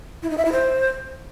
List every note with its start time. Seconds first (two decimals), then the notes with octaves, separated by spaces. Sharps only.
0.23 E4
0.30 D#4
0.38 E5
0.45 E4
0.52 C5